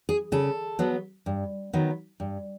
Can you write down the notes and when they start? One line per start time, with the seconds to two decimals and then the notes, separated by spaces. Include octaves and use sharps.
0.09 G#4
0.32 C#3 A4
0.79 F#3 B3
1.26 G2
1.73 D#3 F#3 B3
2.20 G2